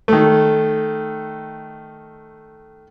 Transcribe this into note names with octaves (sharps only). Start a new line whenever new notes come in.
D#3 A3